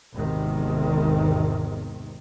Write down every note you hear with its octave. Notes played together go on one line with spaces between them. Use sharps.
G#1 E2 C3 D#3